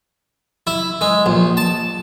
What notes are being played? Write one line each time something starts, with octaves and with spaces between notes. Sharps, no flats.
E4
G#3
A#1
A5